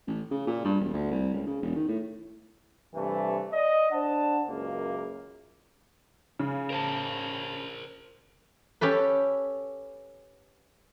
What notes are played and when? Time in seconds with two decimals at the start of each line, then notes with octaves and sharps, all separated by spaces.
0.07 A1
0.31 C#3
0.47 A#2
0.65 G2
0.80 E1
0.93 D2
1.11 C2
1.34 C#2
1.47 C#3
1.62 E1
1.76 D#3
1.88 A2
2.94 G2 C3 E3 A3
3.51 D5 D#5
3.92 D4 C5 F#5 A5
4.48 C#2 F#2 A#3
6.39 C#3
6.70 A#4 C5 A5
8.81 C#4 G4 A4 B4